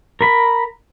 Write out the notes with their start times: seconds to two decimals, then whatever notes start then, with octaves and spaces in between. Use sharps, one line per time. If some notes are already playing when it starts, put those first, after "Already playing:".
0.21 A#4 B5